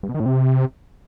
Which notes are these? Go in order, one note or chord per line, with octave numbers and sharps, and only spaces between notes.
G2
B2
D#3
A2
C3